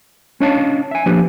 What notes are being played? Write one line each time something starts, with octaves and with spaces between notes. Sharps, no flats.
C#4 D4 C#5 D#5 F5 A5
E5 G#5
F3 A#3 D4 G4 B4